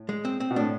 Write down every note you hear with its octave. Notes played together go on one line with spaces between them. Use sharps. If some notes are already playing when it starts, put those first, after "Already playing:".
Already playing: A2
G#3
C4
C4
B2
A2 D4